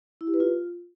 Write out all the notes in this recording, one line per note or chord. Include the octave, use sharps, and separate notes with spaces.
E4
G4
B4
F4